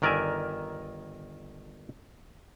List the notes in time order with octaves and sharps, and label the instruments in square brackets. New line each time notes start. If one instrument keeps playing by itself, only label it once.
[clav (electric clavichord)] G1 D#3 A#4 D5 E5 G#5